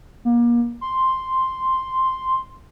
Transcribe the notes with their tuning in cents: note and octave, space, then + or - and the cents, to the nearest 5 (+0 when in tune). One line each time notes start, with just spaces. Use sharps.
A#3 +30
C6 +0